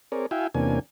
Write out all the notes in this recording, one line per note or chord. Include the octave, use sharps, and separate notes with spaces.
C4 G#4 A#4 C#5 D5
E4 F#4 E5 F5 G5 G#5
E2 C3 A#3 C#4 D4 G#5